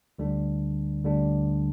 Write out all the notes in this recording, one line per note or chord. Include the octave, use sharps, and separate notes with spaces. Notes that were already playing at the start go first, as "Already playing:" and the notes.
D2 D3 G3 D4
D2 D3 G3 D4